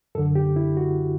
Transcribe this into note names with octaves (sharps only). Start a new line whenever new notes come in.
F#2 D3 A4
G4
E4
F#4